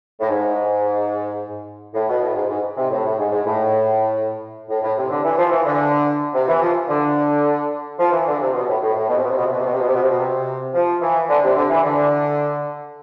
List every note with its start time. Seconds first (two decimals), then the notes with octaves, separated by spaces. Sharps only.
0.20 A2
0.29 G#2
1.94 A2
2.08 B2
2.22 A2
2.35 G#2
2.49 G#2
2.77 C3
2.91 A2
3.04 A2
3.18 G#2
3.31 G#2
3.45 A2
4.69 A2
4.82 A2
4.97 C3
5.10 D3
5.25 E3
5.37 F3
5.51 E3
5.66 D3
6.34 C3
6.47 E3
6.61 F3
6.88 D3
7.98 F3
8.12 E3
8.27 D3
8.41 C3
8.54 B2
8.67 A2
8.82 A2
8.94 A2
9.08 B2
9.17 C3
9.23 B2
9.30 C3
9.38 B2
9.44 C3
9.52 B2
9.59 C3
9.66 B2
9.73 C3
9.81 B2
9.87 C3
9.94 B2
10.02 C3
10.09 B2
10.19 C3
10.74 F3
11.01 E3
11.29 D3
11.43 C3
11.56 D3
11.69 E3
11.83 D3